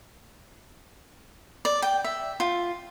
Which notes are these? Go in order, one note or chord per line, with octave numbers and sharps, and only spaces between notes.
D5
G5
E5
F4